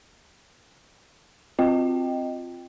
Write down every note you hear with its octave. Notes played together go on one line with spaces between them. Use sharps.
C4 F4 D#5 G5